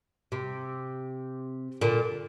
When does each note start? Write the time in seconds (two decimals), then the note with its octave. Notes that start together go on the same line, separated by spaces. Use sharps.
0.32 C3
1.81 A#2 D3